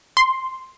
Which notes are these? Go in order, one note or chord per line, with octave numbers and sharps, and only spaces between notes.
C6